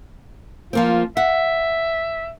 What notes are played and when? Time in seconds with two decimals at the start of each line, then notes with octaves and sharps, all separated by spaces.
0.73 F3 A#3 C4 F4
1.17 E5 F#5